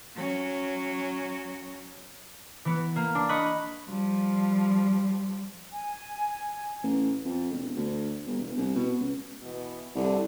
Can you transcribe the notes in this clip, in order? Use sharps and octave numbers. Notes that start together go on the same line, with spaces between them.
F#3 C#4
E3 B3
A#3
D4
D#5 B5 C#6 F#6
F3 G3
G#5
A1
F2
E1
D2
G1
E1
C2
B2
C#2
B2 E3 B3
C2 D3